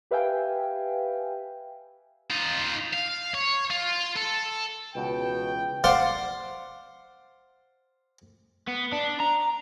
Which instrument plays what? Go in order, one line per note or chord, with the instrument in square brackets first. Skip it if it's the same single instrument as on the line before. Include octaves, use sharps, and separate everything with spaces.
[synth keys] G4 B4 E5 F5 G5 G#5
[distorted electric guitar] D#4 F4
F5
C#5
F4
A4
[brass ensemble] C#2 E3 G5 [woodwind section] B2
[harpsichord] C5 D5 F5 F#5 C6
[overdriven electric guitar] B3
D4
A#5